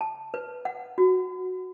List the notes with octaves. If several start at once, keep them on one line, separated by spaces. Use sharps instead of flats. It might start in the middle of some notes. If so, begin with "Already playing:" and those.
A5
B4
F#5
F#4